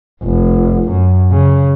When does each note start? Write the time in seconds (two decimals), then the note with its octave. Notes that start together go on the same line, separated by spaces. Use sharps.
0.24 F1
0.89 F#2
1.31 C#3